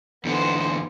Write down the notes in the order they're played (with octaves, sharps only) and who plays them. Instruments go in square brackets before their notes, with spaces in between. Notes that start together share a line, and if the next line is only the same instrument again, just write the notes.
[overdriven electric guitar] E2 D3 [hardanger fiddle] B3 C5